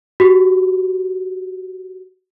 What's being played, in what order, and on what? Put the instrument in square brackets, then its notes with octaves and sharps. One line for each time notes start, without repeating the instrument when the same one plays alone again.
[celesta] F#4 G4